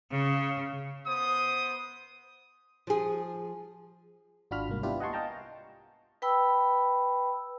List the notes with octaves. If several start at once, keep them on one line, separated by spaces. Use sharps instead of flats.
C#3
B3 C5 D#6
F3 G#4
G#1 D4 F4 F#4 B5 F6
C2 G#2 A#3
B3 D4 E4 F4 G4 B4
D#5 F#5 G#5 A5 C6 C#6
D#5 F5 G5 A5 A#5
B4 G5 B5 E6